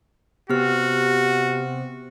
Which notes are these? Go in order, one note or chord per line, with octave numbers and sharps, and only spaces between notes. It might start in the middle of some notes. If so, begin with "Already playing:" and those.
C3 B3 F#4 G4 F6